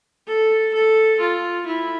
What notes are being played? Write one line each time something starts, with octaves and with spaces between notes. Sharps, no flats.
A4
A4
F4
E4